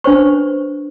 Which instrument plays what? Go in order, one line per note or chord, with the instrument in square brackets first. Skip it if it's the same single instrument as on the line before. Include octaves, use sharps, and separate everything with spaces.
[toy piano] D4 B4 C5 C#6